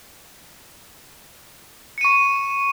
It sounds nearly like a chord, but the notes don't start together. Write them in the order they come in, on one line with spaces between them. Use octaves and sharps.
C#7 D#7 C#6